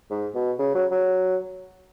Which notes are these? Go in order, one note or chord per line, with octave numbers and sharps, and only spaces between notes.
G#2
B2
C#3
F#3
F#3